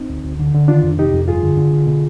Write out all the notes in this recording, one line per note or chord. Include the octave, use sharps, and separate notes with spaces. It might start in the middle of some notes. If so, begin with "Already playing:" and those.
Already playing: C4 D#4
D2
D2
D3
D3
D#3 D4 F4
F2
C3 D#4 G4
F2
G2 F4 G#4
D3
D3
D3
B2